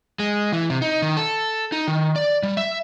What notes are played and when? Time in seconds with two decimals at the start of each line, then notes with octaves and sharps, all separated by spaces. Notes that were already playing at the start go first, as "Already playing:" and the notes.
0.19 G#3
0.53 E3
0.70 C3
0.82 D#4
1.02 D#3
1.17 A4
1.72 D#4
1.87 D#3
2.16 D5
2.43 G3
2.57 E5